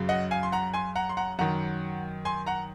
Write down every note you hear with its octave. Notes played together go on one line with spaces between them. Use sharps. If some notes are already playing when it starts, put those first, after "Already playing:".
Already playing: F#2 C#3
D#5 F#5
F5 G#5
C6
F#5 A#5
G#5 C6
F#5 A#5
C6
F#5 A#5
F#2 D#3 F#5 A#5
G#5 C6
F#5 A#5